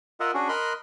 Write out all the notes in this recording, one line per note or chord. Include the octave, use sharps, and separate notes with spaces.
F4 A#4 D#5 E5 F#5
C#4 D4 F#4 G#4
A#4 D#5 B5 C6 F#6